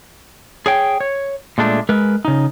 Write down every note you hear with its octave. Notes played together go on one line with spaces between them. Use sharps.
G#4 C#5 G5
C#5
A#2 G#3 A3 D4
G#3 A#4 B4
C#3 D#4